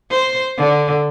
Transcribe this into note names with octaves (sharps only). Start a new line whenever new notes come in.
C5
D3